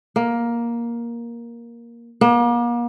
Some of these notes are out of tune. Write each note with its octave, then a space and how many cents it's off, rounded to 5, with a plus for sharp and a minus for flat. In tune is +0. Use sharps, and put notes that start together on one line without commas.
A#3 +10
A#3 +40